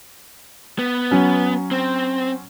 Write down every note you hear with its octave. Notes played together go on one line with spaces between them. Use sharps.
B3
F#3 C#4
C4